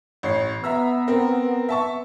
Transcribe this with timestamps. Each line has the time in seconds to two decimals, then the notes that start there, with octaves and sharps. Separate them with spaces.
0.23 A1 C#5 C7
0.64 B3 E5 A#5 E6
1.08 C4 A#4
1.69 E5 A5 C#6